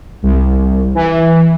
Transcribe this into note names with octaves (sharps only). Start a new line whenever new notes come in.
C2
E3